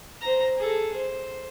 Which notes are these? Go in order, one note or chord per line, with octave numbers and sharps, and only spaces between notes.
C5 A#5
G#4 A4
C5